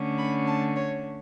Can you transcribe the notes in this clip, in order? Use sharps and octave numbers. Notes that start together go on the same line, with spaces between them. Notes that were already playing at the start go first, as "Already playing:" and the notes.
Already playing: D3 A3 C#4
B5
A5
C#5